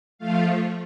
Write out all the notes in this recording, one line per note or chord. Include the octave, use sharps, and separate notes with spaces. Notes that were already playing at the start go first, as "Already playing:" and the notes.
F3 A3 F4 F5